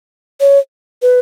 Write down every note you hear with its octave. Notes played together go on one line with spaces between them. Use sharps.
C#5
B4